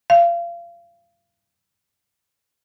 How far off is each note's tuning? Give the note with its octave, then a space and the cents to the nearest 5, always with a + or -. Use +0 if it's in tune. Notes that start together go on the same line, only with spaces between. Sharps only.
F5 -30